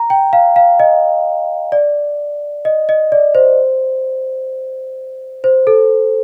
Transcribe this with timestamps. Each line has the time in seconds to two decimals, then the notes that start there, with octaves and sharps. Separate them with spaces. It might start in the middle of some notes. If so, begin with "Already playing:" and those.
Already playing: A#5
0.10 G5
0.33 F5
0.56 F5
0.80 D#5
1.72 D5
2.65 D#5
2.89 D#5
3.12 D5
3.35 C5
5.44 C5
5.67 A4